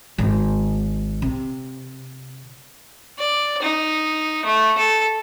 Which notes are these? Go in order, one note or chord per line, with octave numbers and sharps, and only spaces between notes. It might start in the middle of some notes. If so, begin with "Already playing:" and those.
G#1
C3
D5
D#4
A3
A4